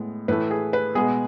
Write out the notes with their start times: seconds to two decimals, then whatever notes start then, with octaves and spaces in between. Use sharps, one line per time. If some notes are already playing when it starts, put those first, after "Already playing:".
Already playing: A2 G#3 B3
0.28 A2 E3 A3 B4
0.51 G#4
0.73 B4
0.95 B2 G#3 B3 G#4